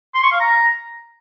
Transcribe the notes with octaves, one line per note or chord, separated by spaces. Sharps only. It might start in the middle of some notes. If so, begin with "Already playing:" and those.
C6
C#6
F5
A#5